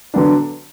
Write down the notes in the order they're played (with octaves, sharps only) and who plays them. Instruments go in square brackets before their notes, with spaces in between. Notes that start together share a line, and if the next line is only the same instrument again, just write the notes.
[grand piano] D3 F#3 B3 D4